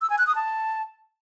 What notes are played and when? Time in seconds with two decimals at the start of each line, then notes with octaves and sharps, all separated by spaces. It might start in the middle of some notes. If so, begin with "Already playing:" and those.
0.02 E6
0.10 G#5
0.18 F#6
0.27 D#6
0.35 A5